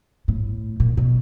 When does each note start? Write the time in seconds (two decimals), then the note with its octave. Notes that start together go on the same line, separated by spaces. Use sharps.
0.28 A2
0.80 A#2
0.97 B2